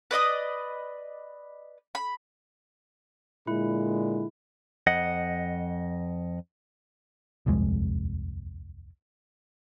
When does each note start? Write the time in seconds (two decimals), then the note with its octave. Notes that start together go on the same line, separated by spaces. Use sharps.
0.11 B4 D5 D#5 D#6
1.95 B5
3.47 A#2 D3 G#3 E4
4.87 F2 D#5 F#5
7.46 D#1 C2 F2 G#3